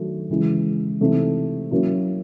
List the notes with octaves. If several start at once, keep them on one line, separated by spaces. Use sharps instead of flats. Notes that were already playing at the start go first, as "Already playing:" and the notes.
Already playing: D#3 F#3 A3 D4
C#3 E3 G#3
C3 E3 A3 C4 D#4
F#3 A#3 C#4 E4